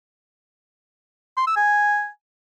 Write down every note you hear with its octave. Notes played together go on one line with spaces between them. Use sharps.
C6
E6
G#5